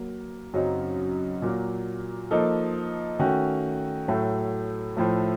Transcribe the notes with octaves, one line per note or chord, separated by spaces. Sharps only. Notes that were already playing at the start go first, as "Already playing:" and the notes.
Already playing: F#3 A#3
F#2 C#3 F#3 C4 D#4
A#2 F#3 A#3
F3 A#3 D#4 A4
D#3 A3 C#4 F#4
A2 F#3 A3
A2 F3 A3